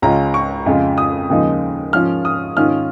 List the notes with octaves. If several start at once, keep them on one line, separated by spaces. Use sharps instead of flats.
C#2 C#3 G#3 C#4 F4 A#5
C#6
F2 C#3 G#3 F4
D#6
D#2 C#3 F3 G#3 D#4
G#2 F3 C#4 F4 F6
D#6
G#2 D#3 C#4 F4 F6